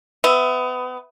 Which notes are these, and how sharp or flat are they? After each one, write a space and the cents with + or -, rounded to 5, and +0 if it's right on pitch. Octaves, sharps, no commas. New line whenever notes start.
B3 +30 E5 +0